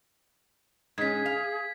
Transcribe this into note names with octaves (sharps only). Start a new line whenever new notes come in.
G#2 C#4 G#4 G#6 B6
F5